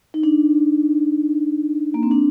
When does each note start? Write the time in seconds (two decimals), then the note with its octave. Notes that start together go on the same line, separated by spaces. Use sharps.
0.14 D#4
0.23 D4
1.94 A#3
2.03 C4
2.11 D4